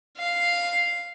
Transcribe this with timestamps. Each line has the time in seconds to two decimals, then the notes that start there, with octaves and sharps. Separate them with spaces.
0.19 F5